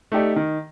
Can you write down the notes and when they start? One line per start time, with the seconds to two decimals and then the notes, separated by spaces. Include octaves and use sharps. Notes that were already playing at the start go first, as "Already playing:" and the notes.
0.12 A3 D#4 G4 D5
0.36 D#3